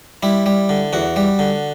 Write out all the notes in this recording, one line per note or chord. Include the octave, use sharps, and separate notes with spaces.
G3 E4
G3
D3
E2 F#4
G3
D3